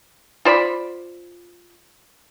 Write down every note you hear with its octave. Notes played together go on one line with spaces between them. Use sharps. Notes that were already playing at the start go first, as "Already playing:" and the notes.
F4 C5 D5 B5